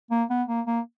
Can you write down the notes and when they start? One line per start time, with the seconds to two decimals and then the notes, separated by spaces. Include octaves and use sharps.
0.11 A#3
0.30 B3
0.48 A#3
0.67 A#3